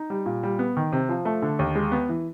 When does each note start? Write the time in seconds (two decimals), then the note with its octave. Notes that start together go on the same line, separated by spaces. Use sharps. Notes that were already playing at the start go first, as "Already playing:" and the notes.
Already playing: D#4
0.10 G3
0.26 A#2
0.43 G3
0.59 B3
0.77 D#3
0.92 C3
1.09 F3
1.25 A3
1.42 D3
1.59 D#2
1.75 G#3
1.92 B3
2.09 E3